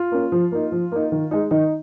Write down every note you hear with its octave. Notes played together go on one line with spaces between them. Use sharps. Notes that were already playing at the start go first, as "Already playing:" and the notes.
Already playing: F4
A#3 C#4
F3
A#3 D#4
F3
A#3 D#4
D#3
G#3 D#4
D#3 D#4